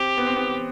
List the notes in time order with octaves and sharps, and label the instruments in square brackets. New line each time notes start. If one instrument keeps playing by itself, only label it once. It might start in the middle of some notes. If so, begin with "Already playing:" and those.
Already playing: [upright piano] C4 [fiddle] G4
[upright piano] B3
C4
B3